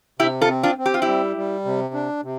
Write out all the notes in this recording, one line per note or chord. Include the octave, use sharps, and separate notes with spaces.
C3 E4 G4
F4 A4
C4
D4 F4
C4
G4
F4
G3 E4 G4
G3
C3
D4
C3